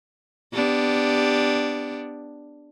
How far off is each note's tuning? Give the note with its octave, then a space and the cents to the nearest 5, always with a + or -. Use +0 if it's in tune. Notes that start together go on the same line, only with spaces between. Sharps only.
B3 +15 D4 +0 G4 +10